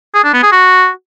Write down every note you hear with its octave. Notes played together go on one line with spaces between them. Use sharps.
G#4
D4
B3
G#4
F#4